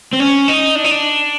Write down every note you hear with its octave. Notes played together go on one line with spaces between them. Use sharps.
C4
C#4
D#4
D4
D#4
D4